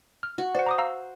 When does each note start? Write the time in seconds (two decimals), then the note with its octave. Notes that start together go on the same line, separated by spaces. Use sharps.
0.23 F6
0.38 F#4
0.55 C5 D5 F#5
0.66 A#5 D6 D#6
0.78 F5 A#5 E6